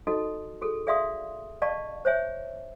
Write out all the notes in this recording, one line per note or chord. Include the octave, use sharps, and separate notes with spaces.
D#4 F#4 A4 D#5
F#4 G#4 A4
G#4 D5 E5 F5 C6 D#6
D5 D#5 F5 A5 C#6
C5 C#5 E5 G#5